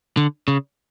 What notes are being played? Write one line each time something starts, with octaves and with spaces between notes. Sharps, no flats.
D3
C#3